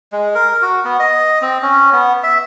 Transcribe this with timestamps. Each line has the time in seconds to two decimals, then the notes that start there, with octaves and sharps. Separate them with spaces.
0.12 G#3
0.35 A#4
0.62 F#4
0.85 B3
1.00 D#5
1.42 C4
1.62 C#4
1.93 B3
2.23 E5